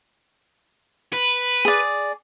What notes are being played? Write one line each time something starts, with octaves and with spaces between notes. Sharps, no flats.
B4
G#4 D5